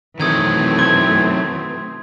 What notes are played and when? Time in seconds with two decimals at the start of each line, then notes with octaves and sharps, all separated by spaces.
0.20 D#3 E3 F#3 A3 C4 D#6 G#6 D#7
0.79 C6 G#6